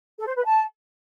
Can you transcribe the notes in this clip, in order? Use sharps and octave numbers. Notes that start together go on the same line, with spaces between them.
A4
C5
B4
A5